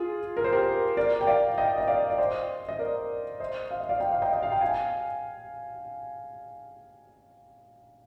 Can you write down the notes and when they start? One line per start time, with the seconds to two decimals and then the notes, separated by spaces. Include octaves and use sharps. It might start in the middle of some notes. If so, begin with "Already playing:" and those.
Already playing: F4 G#4
0.37 A#4
0.44 C5
0.52 G4 A#4
0.97 A#4 D5
1.21 G5
1.27 D5 F5
1.58 D#5 G5
1.78 D#5
1.87 D5 F5
2.10 D5
2.18 C5 D#5
2.69 D#5
2.79 A#4 D5
3.40 C5 D#5
3.71 F5
3.80 D#5
3.89 D5 F5
4.00 G5
4.11 F5
4.22 D#5 G5
4.33 D#5
4.43 F5
4.52 G5
4.61 F5 G#5